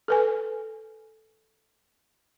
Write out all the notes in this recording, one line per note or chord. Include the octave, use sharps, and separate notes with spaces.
A4 B4 G#5